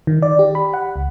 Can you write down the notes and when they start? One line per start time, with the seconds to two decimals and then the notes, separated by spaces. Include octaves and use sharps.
0.07 D#3
0.22 D5
0.39 G4
0.55 B5
0.74 F#5
0.96 C#2